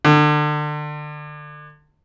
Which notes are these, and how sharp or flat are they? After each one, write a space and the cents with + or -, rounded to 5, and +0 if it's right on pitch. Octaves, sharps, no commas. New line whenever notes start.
D3 +30